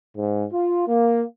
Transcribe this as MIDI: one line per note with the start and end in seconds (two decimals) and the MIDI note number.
0.16 0.44 44
0.52 0.85 65
0.87 1.23 58